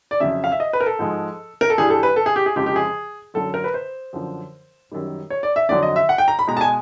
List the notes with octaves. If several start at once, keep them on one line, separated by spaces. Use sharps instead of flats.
D5
F2 C#3 F#3 E5
F5
E5
D#5
B4
A#4
A4
G#2 F3 G#3
A#4
A4
G2 E3 G3 G#4
A4
B4
A4
G#4
G4
G#4
F2 C#3 F3 G#3 G4
G4
G#4
F#2 D3 F#3 A4
A#4
B4
C5
F#2 D3 F3
F#2 D#3 G3
C#5
D5
E5
F2 D3 F#3 D5
D#5
E5
F#5
G5
A#5
B5
B2 G#3 A#5
A5
G#5